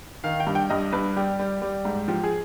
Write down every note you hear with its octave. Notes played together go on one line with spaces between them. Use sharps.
D#3 F5
G5
G2
G5
G2 D#5
G2 B4
G3 G4
G3
G3
G#2
F3 G4
G#4